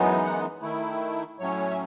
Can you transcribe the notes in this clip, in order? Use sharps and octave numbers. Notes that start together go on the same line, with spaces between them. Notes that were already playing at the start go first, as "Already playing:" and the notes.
Already playing: F#2 E3 G#3 B3 D#4
F#5
D#3 A3 E4
A2 F#3 A3 C#4 C#5
E5